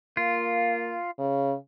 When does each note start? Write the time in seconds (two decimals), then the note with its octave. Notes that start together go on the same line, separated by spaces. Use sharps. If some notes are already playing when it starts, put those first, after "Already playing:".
0.17 A#3 F4
1.18 C#3